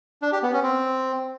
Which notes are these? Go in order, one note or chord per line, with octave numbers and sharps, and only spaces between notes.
D4
G4
B3
C#4
C4